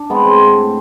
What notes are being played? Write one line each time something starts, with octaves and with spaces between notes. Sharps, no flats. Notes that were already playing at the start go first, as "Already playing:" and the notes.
Already playing: D4
G#3 B3 C4 B4
C4 C5
A2